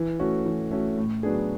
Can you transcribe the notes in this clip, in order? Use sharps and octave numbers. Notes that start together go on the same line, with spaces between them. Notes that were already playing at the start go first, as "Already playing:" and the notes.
Already playing: E3
A3 C#4 F#4
E3
A3 C#4 F#4
A2
F#3 B3 D4 G#4